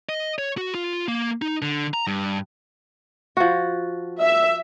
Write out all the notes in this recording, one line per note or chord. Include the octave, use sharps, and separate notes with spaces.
D#5
C#5
F#4
F4
A#3
D#4
D3
A#5
G2
F3 F#4
E5